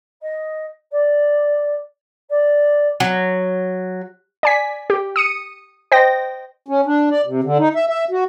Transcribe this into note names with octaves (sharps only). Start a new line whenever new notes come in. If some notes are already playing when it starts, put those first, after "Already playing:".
D#5
D5
D5
F#3
D5 G#5 B6
G4
D#6 C#7 D#7
C5 D#5 G5 A#6
C#4
D4
D5
C3
D3
D#4
E5
E5
F#4